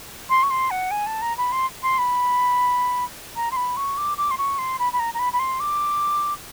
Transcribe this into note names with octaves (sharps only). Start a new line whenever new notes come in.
C6
C#6
C6
F#5
G#5
A5
A#5
B5
C6
C6
B5
A#5
C6
B5
C#6
D6
D6
C6
C#6
C6
B5
B5
A#5
A#5
B5
B5
C6
D6